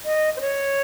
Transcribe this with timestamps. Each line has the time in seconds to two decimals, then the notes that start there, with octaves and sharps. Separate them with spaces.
0.05 D#5
0.37 C5
0.41 C#5